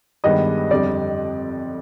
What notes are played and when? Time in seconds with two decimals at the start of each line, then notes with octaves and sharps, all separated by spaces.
0.24 G2 D#3 G#3 B3 D#5
0.71 F2 D3 G3 D5